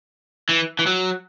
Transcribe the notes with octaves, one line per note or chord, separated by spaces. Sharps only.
E3
E3
F#3